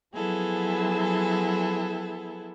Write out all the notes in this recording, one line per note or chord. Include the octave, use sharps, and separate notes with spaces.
F3 F#3 B3 E4 G#4 A4